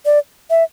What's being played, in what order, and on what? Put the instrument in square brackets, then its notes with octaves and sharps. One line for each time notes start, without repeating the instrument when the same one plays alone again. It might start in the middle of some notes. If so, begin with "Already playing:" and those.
[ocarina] D5
E5